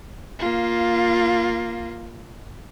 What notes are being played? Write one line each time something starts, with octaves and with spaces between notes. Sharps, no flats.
A#3 F4